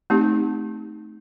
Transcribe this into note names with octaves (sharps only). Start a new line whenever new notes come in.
A3 C4 D#4 G4